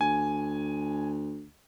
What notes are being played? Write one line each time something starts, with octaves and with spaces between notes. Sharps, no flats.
D2 G#5